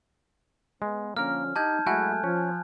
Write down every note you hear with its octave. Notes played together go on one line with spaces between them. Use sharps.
G#3 B3
D3 F3 A#3 C#4 A#4 F6
D#4 G4 D#5 A5 G6 G#6
F#3 G#3 A3 E4 F#4 G#5 F#6
F3 C#4